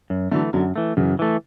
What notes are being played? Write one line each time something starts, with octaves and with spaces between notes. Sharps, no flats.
F#2
D3 E3 F#3 A3
F#2 D3 F#3
E3 A3
F#2 C#3 E3
E3 A3